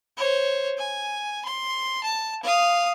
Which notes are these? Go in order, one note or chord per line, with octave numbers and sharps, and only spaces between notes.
C5 C#5
G#5
C6
A5
F5 D#6